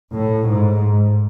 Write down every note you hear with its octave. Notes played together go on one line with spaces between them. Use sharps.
A2
G#2